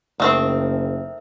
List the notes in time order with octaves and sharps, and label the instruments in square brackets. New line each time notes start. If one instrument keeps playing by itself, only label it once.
[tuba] F#1 [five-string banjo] D#3 A3 C4